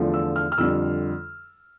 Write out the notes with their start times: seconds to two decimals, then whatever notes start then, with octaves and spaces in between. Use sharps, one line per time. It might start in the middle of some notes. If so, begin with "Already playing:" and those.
Already playing: E2 D3 F3 A3
0.14 E6
0.36 F6
0.52 F6
0.58 F2 D3 G3 E6